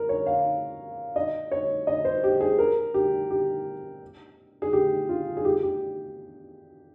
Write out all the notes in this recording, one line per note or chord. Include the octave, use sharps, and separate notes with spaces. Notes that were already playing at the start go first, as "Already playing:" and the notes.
Already playing: A#4
C#5
F5
D#5
C#5
D#5
C5
G4
G#4
A#4
G4
G4
G#4
G4
F4
G#4
G4
G4